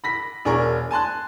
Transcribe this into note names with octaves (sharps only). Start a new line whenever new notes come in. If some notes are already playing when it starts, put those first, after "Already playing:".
B5 A#6 B6
E1 D4 G#4 A#4 C#6
G#5 A5 C6 F#6